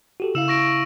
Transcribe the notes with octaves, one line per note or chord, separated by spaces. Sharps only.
F#4 G4 A4
C#3 E4 F5 E6 E7
C#6 A#6 D7